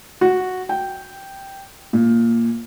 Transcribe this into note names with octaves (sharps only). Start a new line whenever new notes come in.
F#4
G5
A#2